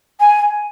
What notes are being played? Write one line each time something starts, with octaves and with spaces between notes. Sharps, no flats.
G#5